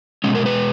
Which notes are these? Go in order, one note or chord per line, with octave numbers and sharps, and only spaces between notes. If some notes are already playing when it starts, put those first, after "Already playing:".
B2 G#3 C#4
A#4
B4